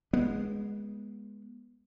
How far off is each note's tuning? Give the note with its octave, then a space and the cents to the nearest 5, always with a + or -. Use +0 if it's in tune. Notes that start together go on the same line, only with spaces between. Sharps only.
G#3 +0 B3 -20